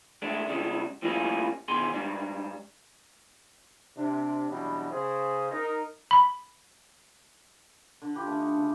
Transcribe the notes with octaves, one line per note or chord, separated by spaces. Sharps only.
G#3 A3 D4
C#3 G3 G#3 D4
A2 F3 G3 A#3 C#4 G#4
B2 D3 D#3 G#4 C6
G#2 G3 D4
C3 D4
E2 B2 F#3 G3 C#4 D4
C#3 G#4 C5
D#4 A#4
B5
D3
F4 G4 B4
D3 A3 C#4
D#4
C#3